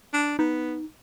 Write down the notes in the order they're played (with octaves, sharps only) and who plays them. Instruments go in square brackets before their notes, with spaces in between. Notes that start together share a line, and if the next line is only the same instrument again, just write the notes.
[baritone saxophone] D4
[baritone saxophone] B3 [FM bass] D#4